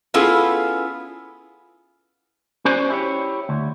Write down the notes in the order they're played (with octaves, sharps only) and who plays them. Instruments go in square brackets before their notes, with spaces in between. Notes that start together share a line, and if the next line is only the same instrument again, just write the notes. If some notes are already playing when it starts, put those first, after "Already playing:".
[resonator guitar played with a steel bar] B3 C#4 E4 F4 G#4 A4
[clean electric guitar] C#4 F#4 C5 D5 G#5
E4 G4 C#5
D2